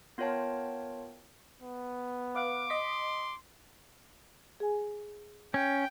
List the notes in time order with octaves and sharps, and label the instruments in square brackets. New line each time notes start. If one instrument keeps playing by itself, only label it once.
[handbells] B3 F4 A#4 C#5 G5 A5
[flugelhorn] B3
[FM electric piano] B4 F5 F#5 [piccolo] D6
[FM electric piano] D#5 B6 [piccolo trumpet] C6
[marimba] G#4 G#5
[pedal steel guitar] C#4 [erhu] G5